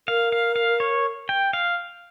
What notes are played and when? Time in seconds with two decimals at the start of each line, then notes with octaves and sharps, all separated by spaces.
0.08 A#4 F5
0.32 F5
0.56 F5
0.80 C#5
1.29 G5
1.53 F5